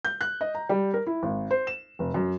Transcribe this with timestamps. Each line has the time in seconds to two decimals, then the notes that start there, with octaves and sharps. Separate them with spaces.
0.05 G6
0.21 F#6
0.41 D#5
0.55 A#5
0.69 G3
0.94 A#4
1.07 E4
1.23 G#1
1.51 C5
1.67 E7
1.99 F1
2.14 F#2